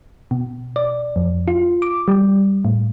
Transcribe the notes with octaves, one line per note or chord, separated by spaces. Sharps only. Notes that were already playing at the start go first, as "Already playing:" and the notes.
B2
D5
F2
F4
D6
G3
A2